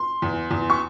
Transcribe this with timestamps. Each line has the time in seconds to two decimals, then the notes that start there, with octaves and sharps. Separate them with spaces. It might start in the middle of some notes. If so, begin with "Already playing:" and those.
Already playing: C6
0.22 E2
0.51 E2
0.70 C#6